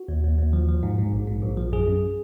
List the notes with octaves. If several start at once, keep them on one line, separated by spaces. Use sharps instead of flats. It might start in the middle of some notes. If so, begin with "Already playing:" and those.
Already playing: F#4
D#2
D#2
D#2
F3
F3
G#2
G#2
A#1
G#2
A#1
F3
F#2 G#4
F#2